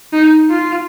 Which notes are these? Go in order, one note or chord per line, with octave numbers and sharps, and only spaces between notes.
D#4
F4